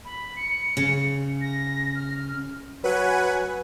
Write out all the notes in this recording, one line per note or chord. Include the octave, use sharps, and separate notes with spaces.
B5
C#7
C#3
A#6
F6
F#3 B4 F#5 G#5